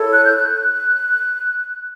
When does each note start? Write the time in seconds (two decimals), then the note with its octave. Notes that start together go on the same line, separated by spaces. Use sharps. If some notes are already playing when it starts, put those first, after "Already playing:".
Already playing: E4 A4 C#5
0.12 F#6
0.24 G6
0.36 F#6